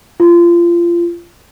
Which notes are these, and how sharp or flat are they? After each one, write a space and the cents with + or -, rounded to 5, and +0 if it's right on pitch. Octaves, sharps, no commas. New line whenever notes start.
F4 -25